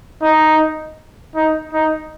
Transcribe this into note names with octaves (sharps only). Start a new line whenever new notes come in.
D#4
D#4
D#4